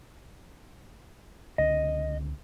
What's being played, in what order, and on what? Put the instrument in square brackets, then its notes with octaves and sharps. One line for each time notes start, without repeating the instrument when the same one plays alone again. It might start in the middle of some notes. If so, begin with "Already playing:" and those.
[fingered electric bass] C#2 D3 C4 [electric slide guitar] D#5